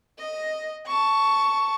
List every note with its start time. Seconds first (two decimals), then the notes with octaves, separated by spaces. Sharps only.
0.18 D#5
0.86 A5 C#6